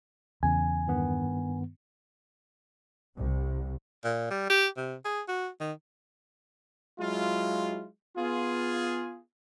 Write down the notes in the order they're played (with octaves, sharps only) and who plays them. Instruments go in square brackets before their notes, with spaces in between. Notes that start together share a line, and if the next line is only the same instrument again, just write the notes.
[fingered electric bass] E2 C#3 [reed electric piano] G#5
[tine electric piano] G2 D#3 B3
[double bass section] C2
[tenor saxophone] A#2
G3
G4
C3
G#4
F#4
D#3
[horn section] F#3 G#3 E4 F4
B3 F4 G#4